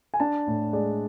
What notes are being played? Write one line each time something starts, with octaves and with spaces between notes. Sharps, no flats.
G#5
D4 A5
A2
G#3 D5